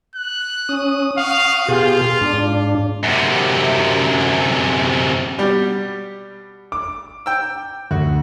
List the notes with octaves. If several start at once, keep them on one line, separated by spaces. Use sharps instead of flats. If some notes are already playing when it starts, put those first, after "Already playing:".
F#6
C#4 D#6
F5 F#5 C#6 D#6
B2 F4 G4 G#4
G#2 D4
F#2 C3
B2 G3 G4
D6
G5 E6
D2 F#4